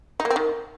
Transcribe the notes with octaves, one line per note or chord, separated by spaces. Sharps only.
D#4
A#3
C4
D#3